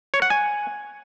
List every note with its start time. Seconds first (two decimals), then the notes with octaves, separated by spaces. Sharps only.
0.14 C#5
0.22 F#5
0.30 G#5